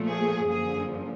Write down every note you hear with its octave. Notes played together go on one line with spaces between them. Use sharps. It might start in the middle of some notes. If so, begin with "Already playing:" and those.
Already playing: A#2 F3 A3
G#4
F#2 D3 F3 A#3 G#4